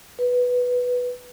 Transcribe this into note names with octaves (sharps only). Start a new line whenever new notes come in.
B4